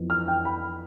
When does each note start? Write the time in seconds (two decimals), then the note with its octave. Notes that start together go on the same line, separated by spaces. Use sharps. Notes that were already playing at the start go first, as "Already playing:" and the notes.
Already playing: F2 E3 B3
0.10 F6
0.28 G5
0.45 B5